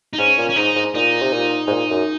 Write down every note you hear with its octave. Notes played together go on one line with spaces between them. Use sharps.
D#4
G#2 C#4
A#2
C#4
G#2 D#4
G#2
A#2 D#4
C3
A#2
G#2
A#2
F#2